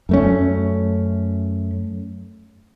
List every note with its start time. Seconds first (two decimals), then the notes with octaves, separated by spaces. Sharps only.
0.09 F#2 A3 C#4